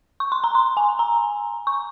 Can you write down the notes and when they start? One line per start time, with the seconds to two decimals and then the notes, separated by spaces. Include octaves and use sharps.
0.20 C#6
0.32 C6
0.44 A#5
0.55 C6
0.77 G#5
0.99 A#5
1.67 C#6